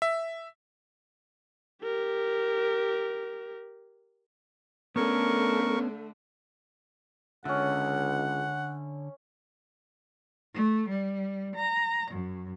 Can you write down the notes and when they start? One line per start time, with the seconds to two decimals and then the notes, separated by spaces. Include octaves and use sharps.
0.02 E5
1.83 G4 A#4
4.96 D3 A3 B3 C#4 A#4 C#6
7.45 C#2 D3 C#4 E5 F#5
10.54 A3
10.90 G3
11.56 A#5
12.12 F#2